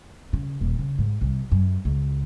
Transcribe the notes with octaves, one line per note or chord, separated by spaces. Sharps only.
C#3
D#1
C#3
G#2
C2
F#2
C#2